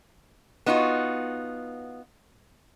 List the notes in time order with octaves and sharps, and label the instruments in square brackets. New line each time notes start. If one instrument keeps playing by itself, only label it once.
[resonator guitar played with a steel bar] B3 D#4 F4 F#4